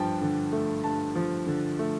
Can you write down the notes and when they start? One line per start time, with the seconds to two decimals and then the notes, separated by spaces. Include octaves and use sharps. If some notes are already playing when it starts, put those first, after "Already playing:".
Already playing: G2 F3 G5 A5
0.21 D3
0.52 A3
0.84 G2 A5
1.15 F3
1.47 D3
1.79 A3